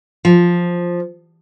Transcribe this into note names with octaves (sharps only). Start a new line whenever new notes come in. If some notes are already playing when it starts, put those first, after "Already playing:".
F3